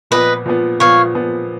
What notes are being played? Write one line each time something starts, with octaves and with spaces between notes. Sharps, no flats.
A#2 F3 B3 B4 D#5
A#2 F3 B3
A#2 F3 B3 C#5 F5
A#2 F3 B3